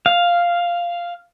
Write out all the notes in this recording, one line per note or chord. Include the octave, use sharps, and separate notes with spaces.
F5